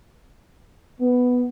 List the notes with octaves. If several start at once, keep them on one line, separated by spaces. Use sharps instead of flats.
B3